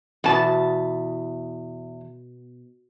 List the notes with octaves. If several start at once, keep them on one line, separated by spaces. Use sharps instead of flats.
E2 B2 B3 A5